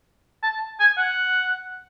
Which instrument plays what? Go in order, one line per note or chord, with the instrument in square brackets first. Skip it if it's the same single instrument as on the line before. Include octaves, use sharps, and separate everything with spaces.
[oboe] A5
G#5
F#5